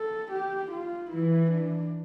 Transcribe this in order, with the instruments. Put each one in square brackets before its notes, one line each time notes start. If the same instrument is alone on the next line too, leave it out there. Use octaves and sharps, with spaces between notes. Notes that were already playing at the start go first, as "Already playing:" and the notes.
Already playing: [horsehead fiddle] A4
G4
F4
[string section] E3 [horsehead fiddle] E4
[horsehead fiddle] D4